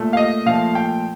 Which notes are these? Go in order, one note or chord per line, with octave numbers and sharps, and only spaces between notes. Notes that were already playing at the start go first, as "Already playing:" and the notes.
Already playing: A#2 A3
F5
D#5
A#2 F3 A3 F5
G5